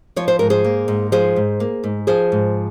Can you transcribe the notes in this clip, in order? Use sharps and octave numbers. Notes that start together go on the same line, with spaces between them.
F3 C#5
C5
G#2 A#4
G#4 C5
A#3
G#2
F3 G#4 C5
G#2
A#3
G#2
F3 G#4 C5
G#2